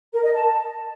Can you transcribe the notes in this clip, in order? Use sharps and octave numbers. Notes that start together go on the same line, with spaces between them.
A#4
D#5
A5